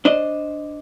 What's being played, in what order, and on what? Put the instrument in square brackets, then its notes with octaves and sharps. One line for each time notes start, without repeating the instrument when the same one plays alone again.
[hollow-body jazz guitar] D4 C5 D#5